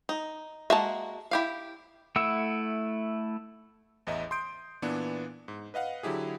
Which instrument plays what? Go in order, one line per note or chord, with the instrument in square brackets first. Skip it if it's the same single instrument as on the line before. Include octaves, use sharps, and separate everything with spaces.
[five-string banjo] D#4
[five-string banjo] G#3 A#3 F#4 [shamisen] E5 A5
[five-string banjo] E4 G4 F5
[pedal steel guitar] A3 E4 F#5 E6
[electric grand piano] A1 E2 D#5 E5
C6 D#6 G6 D7
A#2 E3 B3 D4
G#2
B4 D#5 F5 F#5
D3 F#3 E4 G4 G#4